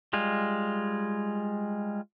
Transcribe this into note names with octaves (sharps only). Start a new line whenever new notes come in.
G3 G#3 F4